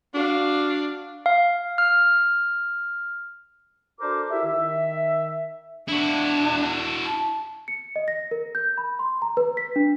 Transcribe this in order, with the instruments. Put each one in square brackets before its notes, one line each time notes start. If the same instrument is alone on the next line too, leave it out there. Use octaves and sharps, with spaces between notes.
[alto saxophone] D4 [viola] F#4 F5
[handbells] F5
F6
[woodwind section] D4 F#4 A4 A#4 C5 D6
E4 G4 A#4 E5
D#3 E5
[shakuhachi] D4 [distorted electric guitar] E4 F#4
[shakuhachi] A5
[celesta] C#7
D#5
A#6
A#4
G6
B5
C6
A#5
B4
B6
D4